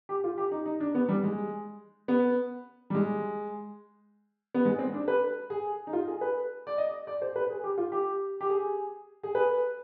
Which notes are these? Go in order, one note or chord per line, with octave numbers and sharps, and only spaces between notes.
G4
F4
G4
D#4
D#4
D4
B3
G3
G#3
B3
G3
G#3
B3
G#3
C4
D4
B4
G#4
D#4
F4
G#4
B4
D5
D#5
D5
C5
B4
G#4
G4
F4
G4
G4
G#4
G#4
B4